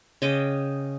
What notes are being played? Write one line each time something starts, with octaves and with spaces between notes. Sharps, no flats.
C#3 D#5 G5 D6